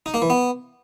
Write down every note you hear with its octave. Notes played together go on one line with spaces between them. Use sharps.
D#4
A#3
E3
B3